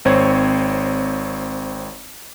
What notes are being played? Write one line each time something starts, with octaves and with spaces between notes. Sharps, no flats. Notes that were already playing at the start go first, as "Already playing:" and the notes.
G#1 C4 C5 C#5 C#6 G#6